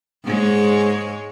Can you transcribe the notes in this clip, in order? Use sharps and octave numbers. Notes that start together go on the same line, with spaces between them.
G#2 G#3 C#5